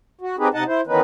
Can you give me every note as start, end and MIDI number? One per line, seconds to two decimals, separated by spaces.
0.21 0.36 66
0.39 0.48 60
0.39 0.48 63
0.39 0.48 67
0.39 0.48 68
0.39 0.48 71
0.54 0.64 48
0.54 0.64 63
0.54 0.64 75
0.54 0.64 78
0.54 0.64 81
0.67 0.81 64
0.67 0.81 72
0.87 1.01 51
0.87 1.01 52
0.87 1.01 59
0.87 1.01 61
0.87 1.01 63
0.87 1.01 71